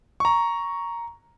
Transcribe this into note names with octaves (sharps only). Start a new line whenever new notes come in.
A#5 C#6